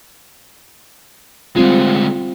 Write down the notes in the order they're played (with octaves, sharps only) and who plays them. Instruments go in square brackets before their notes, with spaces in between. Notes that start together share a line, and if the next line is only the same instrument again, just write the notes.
[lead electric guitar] D2 G#3 [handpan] G3 C4 F4